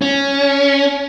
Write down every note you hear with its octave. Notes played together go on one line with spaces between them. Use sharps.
C#4